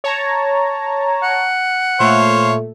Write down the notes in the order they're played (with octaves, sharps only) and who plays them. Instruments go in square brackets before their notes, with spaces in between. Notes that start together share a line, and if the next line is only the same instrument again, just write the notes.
[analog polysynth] C#5 A5 A#5
[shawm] F#5
[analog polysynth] A#2 A3 [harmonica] C5 C#5 F5